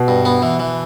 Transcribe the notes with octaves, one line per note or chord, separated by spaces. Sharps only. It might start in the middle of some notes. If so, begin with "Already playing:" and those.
Already playing: B2
G2
B3
E3
E3